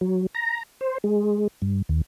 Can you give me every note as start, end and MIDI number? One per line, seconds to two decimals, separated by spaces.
0.01 0.26 54
0.35 0.63 82
0.81 0.98 72
1.04 1.47 56
1.62 1.82 43
1.89 2.01 39